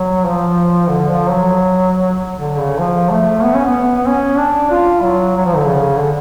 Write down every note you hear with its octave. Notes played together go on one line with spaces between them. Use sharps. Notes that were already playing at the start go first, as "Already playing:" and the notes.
Already playing: F#3
F3
D3
F3
F#3
D3
C#3
F3
A3
B3
C#4
B3
B3
C#4
D4
F4
F#3
F#3
F3
D3
C#3
D3